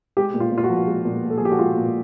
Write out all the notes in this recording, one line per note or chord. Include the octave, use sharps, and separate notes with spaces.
G#3 G4
A#2
F4
A#2
F4
F#4
F3
G#3
A#2
A#2
A4
G#4
F3 G4
F#4
G#3 F4
A#2